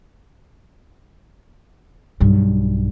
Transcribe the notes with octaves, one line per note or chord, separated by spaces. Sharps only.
B1 G2